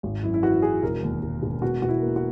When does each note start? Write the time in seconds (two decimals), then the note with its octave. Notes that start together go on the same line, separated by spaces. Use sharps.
0.03 G#1
0.23 F#2 E4
0.34 E4
0.43 E3 F#4
0.62 E3 G#4
0.83 E1 A#4
1.03 D#2
1.22 E1
1.43 E1
1.62 B2 F#4
1.82 B2 F#4
1.89 E4
2.02 A#3
2.16 F#4